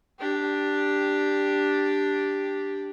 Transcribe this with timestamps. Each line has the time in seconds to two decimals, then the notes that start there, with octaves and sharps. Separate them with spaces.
0.19 D4 G4